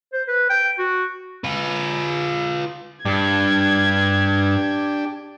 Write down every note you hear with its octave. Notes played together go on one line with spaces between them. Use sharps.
C5
B4
G5
F#4
F4 B4
G2 D4 G4 G#6